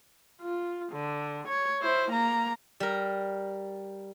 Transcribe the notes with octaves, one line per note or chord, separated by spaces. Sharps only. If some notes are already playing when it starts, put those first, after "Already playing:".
F4
D3
C#5
E4 C5
A#3 A#5
G3 A#4